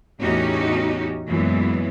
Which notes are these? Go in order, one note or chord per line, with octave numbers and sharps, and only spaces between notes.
E2 A2 C#4 D#4 F#4 G4
F#2 A#2 E3 F#3 G#3 B3